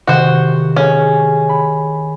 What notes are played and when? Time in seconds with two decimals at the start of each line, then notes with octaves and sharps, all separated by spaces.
0.07 C3 D#3 F#4 C5
0.76 C#4 G#4
1.49 B5